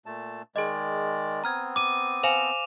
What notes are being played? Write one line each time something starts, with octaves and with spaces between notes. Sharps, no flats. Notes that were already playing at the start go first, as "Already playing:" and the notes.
A#2 A3 A5
D#3 G#3 G#4 D5 D#5
B3 C4 A#5 F6 G#6
D6 D#7
C5 F5 G#5 E7 F7